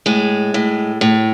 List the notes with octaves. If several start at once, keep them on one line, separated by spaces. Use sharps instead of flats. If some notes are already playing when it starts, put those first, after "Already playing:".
A2 G#3
A2
A2